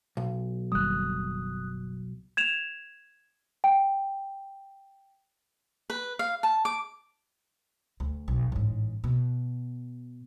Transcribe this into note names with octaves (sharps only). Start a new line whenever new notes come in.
B1
F#1 D#3 G3 D#6 F#6
G#6 E7 F7
G5
B4
F5
A5
D6
D2
B1
A1 G#2
B2